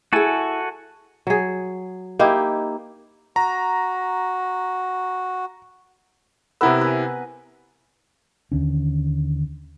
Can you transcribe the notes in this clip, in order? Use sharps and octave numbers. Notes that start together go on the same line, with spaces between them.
E4 F#4 G#4 A4 G#5
F#3 G#4
A#3 D#4 E4 G4
F#4 A#5
C3 B3 E4 A#4 B4 E6
B4 G#5
D#2 D3 C#4